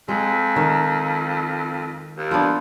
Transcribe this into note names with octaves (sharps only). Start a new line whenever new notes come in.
F2 G#3
D#3
D#2
F3 B3 D4